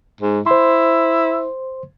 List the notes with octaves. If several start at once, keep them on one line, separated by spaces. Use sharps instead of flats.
G#2
E4 C5 C6